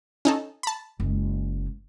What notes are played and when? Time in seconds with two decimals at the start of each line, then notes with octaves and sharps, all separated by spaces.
0.25 C#4 D#4 A4
0.63 A5 B5
1.00 F#1 G#3